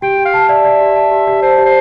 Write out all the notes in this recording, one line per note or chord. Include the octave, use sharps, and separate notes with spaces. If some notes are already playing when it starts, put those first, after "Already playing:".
G4 G5
G4
F5
A5
D5 E5
D5
G4
A5
G4
G4
C5 A5
G4
C5